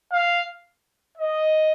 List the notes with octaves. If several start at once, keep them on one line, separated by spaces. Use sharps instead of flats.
F5
D#5